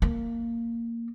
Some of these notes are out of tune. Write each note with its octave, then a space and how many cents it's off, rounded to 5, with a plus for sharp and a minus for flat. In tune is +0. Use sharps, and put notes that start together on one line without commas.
A#3 -10